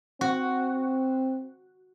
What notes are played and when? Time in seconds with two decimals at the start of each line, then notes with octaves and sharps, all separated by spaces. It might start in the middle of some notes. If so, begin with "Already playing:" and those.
0.21 C4 F#4